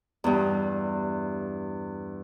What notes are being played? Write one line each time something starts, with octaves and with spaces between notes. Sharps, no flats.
E2 G2